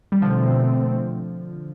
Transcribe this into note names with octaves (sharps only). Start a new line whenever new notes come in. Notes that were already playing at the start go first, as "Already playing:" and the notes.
G3
B2 D3 F3 A3 C4